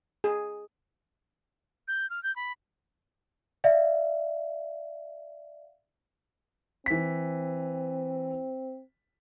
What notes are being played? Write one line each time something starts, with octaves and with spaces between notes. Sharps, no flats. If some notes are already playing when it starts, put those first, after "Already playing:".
G#4
G6
F6
G6
B5
D5 E5 F5
E3 C4 B6